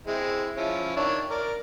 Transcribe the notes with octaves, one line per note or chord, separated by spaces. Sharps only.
G#3 C4 E4
F3 C#4 E4
D#3 D4 C#5
A#4 D5